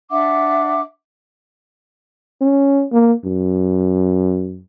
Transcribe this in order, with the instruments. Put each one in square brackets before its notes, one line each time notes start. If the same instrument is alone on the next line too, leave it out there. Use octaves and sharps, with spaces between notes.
[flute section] D4 E5 F#5 D6
[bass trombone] C#4
A#3
F#2